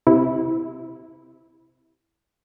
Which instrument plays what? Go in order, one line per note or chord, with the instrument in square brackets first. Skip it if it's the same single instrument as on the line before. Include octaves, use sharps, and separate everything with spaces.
[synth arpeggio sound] C3 E4